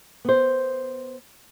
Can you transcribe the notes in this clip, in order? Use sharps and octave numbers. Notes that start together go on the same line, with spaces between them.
B3 C5